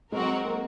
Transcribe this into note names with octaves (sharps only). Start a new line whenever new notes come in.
F#3 G#3 C4 F#4 A#4
A#3